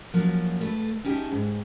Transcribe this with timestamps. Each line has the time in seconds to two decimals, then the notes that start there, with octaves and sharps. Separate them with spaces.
0.14 F3 F#3 A#3 C#4
0.60 A3 A4 B4
1.04 C#4 D#4 G4 E5 A5
1.32 G#2